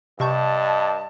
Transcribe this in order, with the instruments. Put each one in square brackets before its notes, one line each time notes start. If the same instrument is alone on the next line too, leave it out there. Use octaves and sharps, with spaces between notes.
[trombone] G2 [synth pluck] C3 C#6 G6 [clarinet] D#5 [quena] A5